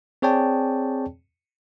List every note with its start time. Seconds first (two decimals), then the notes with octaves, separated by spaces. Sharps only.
0.22 C4 G#4 C#5 D5 G5 A5